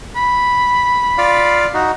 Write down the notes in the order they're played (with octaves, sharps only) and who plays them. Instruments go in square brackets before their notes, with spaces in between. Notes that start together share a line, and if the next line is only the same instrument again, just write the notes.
[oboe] B5
[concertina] F4 D5 F5
D#4 F#4